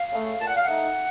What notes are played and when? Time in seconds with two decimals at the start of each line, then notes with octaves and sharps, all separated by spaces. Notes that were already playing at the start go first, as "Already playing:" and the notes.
Already playing: F5
0.11 C#3 A3
0.38 A#2 A5
0.47 F#5
0.55 F5
0.63 A3 D#4 F#5